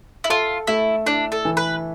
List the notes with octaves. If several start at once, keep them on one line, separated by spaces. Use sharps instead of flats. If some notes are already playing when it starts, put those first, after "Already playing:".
E4
F4 A4
A3 E4
D4 E4
A4
E3
B4